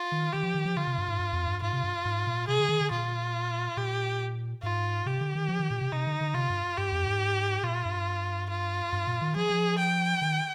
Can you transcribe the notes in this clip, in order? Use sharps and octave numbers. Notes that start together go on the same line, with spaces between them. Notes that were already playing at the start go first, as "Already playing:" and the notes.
Already playing: F4
D#3
D#3 G4
F3
D#3
F3
D3 F4
C3
G2
G#2
G2
F2
G2
G#2 F4
C3
G2
G#2
A#2
C3 G#4
D3
D#3
D3
A#2 F4
A#2 G4
G#2 F4
C3 G4
D3
D#3
F3
D#3
A#2
C3
C3 D#4
D3
D3
C3 F4
G2
G2 G4
F2
G#2
A#2 F4
G2
F4
G2
A#2
D#3
F3 G#4
F3
G5
D#3